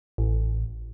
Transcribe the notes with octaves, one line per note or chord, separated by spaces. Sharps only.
A1